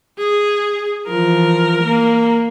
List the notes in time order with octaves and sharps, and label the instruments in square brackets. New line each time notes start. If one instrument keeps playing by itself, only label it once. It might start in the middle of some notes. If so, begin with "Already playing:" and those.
[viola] G#4
[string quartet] E3 F3 [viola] A#4
[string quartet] A#3